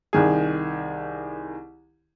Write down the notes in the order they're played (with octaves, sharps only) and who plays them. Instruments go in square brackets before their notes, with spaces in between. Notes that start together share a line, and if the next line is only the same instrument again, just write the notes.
[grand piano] C2 D#3 G#4